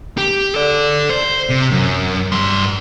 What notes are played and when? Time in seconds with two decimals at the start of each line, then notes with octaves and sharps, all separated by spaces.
0.18 G4
0.55 A4 D5
1.10 C5
1.49 C3
1.71 F#2
2.32 G2 C6